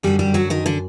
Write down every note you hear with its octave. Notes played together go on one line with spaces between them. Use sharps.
F#2 D3 G3 G4
G3 G4
F#3 F#4
D#3 D#4
D3 D4